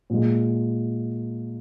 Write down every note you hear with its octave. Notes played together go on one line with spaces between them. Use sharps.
A#2 G#3